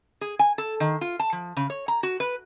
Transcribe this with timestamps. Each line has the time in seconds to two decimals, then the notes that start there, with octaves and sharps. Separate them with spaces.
0.21 G#4
0.39 G#5
0.58 A4
0.80 D#3
1.01 F4
1.20 A5
1.32 F3
1.57 C#3
1.70 C#5
1.88 A#5
2.03 F#4
2.20 B4